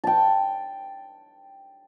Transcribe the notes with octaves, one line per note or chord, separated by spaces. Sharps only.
G5 A5